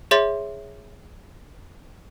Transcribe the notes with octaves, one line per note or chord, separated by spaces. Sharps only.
G#4 C#5 E5 C6 A6